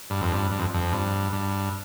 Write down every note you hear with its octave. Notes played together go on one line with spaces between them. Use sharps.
G2
F2
G2
G2
F2
F2
G2
G2